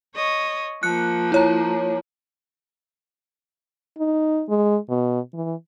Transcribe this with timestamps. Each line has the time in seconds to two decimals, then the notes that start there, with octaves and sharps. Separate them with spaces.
0.15 C#5 D#5
0.83 F3 A#3 F#6 C#7
1.32 E4 C#5 A#5
3.98 D#4
4.49 G#3
4.90 B2
5.34 E3